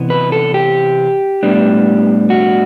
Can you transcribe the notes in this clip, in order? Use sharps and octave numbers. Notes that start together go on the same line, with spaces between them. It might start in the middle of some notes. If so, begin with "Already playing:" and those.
Already playing: C3 E3 B3
B4
A4
G4
A2 G3 B3 D4
F#4